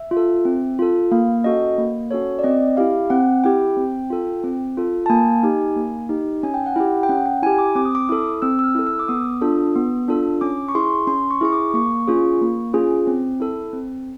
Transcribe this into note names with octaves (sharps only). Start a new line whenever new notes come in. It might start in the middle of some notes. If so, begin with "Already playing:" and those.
Already playing: E5
F4
A4
C4
F4 A4
A#3 F5
C#4 F#4 A4 D#5
A#3
C#4 F#4 A4 C#5
D5
C4 D#5
E4 G4 F5
C4 F#5
E4 G4 G5
C4
F4 A4
C4
F4 A4
A5
A#3 G#5
D#4 G4
A#3
D#4 G4
C#4 G#5
G5
F#5
E4 G4 G5
G5
C#4 F#5
G5
E4 G4 G#5
D6
C4 D6
D#6
D6
E4 A4 D#6
C4 E6
E6
F6
E4 A4
E6
D6
B3 D#6
D4 F4 A4
B3
D4 F4 A4
C#4 D6
C#6
E4 G#4 C6
C#4 C6
C#6
E4 G#4 C#6
D6
A#3 C#6
C#4 F4 G#4
A#3
C#4 F4 G#4
C4
E4 A4
C4